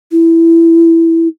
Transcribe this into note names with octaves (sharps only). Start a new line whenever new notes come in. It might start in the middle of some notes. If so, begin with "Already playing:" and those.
E4